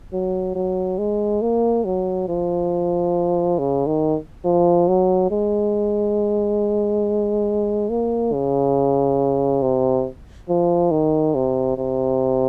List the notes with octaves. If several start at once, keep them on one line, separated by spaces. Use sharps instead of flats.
F#3
F#3
G#3
A#3
F#3
F3
C#3
D#3
F3
F#3
G#3
A#3
C#3
C3
F3
D#3
C3
C3